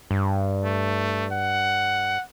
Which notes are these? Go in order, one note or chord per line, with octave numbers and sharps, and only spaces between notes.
G2
A3
F#5